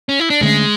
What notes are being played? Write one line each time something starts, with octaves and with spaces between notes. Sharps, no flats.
C#4
E4
D4
D2 D3 G#3 A3 C#4